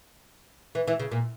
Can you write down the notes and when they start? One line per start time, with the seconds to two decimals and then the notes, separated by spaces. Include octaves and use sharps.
0.75 E3
0.88 E3
1.00 C#3
1.11 A#2